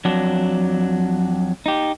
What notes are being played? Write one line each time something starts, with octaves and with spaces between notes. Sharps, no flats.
F2 F#3 D4
D#4 G4